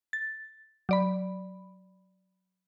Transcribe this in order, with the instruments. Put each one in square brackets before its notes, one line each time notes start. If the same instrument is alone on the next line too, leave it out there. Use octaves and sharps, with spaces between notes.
[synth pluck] A6
F#3 D5 B5